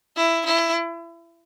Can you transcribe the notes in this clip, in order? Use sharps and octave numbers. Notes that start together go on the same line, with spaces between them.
E4
E4